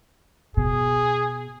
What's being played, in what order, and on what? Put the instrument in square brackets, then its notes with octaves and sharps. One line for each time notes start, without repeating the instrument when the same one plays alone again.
[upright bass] B2 [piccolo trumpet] G#4